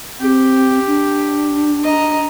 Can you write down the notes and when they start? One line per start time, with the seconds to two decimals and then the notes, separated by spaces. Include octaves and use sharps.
0.20 C4 G4
0.86 D4
1.83 D#5 A#5